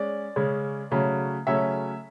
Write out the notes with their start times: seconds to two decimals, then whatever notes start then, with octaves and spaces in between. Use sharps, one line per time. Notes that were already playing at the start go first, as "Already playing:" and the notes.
Already playing: G#3 C#4 D5
0.36 C#3 G#3 C#4
0.91 C#3 F#3 A3 C#4
1.47 C#3 F#3 A3 C#4 E5